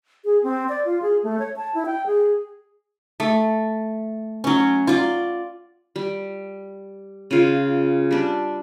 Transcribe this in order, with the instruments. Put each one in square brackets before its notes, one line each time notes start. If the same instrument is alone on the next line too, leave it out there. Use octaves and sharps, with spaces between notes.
[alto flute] G#4
C4
D5
F4
G#4
A3
C#5
A5
E4
G5
G#4
[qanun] A3
F#3 C#4
F4 D5
G3
C#3 F4
G3 D4